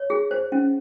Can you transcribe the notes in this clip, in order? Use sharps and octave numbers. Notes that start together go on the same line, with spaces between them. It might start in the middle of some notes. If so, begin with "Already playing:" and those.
Already playing: C#5
G#4
C5
C#4